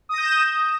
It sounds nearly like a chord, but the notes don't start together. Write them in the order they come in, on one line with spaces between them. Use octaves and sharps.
D#6 A#6 G6 E7